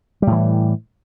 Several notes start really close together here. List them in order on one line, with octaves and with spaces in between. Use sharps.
G3 A2 E3